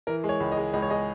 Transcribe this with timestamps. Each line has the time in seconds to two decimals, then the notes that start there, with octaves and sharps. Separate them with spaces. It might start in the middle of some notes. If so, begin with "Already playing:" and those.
0.07 E3 A#4
0.24 G#3
0.29 C#5
0.40 C#2
0.52 D#5
0.57 G#3
0.73 C#2 D#5
0.82 C#5
0.90 G#3 D#5